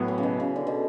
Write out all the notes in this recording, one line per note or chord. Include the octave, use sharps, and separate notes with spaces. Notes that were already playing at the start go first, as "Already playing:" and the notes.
Already playing: A2 F#3 B3
E3
C#3
B2
C#3
D3
B2